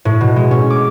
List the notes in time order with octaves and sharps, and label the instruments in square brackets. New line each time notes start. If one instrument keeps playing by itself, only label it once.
[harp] A2
B2
G#3
C#4
D6